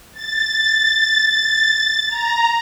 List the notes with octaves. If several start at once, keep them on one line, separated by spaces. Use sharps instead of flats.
A6
A#5